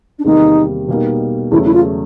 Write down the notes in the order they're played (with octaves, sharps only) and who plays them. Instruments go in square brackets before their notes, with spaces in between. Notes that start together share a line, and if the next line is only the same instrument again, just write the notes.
[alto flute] D4
[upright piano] E2 C3 D#3 G3 A#3 [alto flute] D#4
[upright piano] B2 G3 A#3 D#4
[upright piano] E2 C#3 F#3 A3 [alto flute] E4
[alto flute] E4
F4